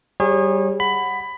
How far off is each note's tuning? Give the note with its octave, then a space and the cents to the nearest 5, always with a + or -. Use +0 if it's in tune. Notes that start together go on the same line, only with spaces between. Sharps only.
G3 -10 G#4 -25 C#5 -35
F#5 +0 B5 +15